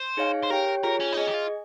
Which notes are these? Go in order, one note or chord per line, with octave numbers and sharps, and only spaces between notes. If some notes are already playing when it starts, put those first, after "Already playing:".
Already playing: C5
D#4 G#4 C#5 F5 G#5
C5
G4 A#4 C#5 G5
F4 G#4 A#4 C#5
C#4
D#4
C#4 G#4 D#5 G#5
G4
F4